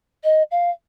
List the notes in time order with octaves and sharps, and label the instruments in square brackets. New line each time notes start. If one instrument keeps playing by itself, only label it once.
[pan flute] D#5
F5